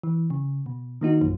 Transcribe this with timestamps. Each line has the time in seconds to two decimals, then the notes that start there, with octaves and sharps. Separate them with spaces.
0.03 E3
0.30 C#3
0.66 B2
1.01 D#3 A#3 D#4 F#4
1.21 A#1 F#2 F3